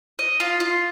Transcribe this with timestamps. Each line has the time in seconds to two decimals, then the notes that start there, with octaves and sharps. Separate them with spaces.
0.19 D#5
0.40 F4
0.60 F4